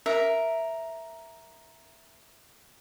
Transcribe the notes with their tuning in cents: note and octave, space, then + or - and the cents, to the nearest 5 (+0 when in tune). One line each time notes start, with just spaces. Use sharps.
A#4 +0 E5 +0